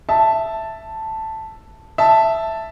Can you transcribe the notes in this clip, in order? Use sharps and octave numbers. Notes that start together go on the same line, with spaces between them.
E5 A5
E5 A5